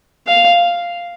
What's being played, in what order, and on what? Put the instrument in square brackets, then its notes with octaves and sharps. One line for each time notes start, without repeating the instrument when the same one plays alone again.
[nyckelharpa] F5